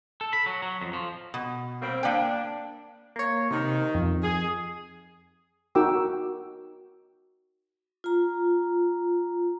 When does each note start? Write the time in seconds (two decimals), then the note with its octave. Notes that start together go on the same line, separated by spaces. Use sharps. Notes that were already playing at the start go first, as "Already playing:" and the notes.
0.21 A4
0.33 B5
0.46 F#3
0.62 F#3
0.82 F2
0.93 F3
1.34 B2
1.81 G3 A#3 C4
2.03 A#3 D4 G5
3.16 A#3 C#5
3.51 C3 D#3
3.95 F2
4.23 G#4
5.75 D#4 F#4 A#4 G5 D6 E6
8.04 F4 A#5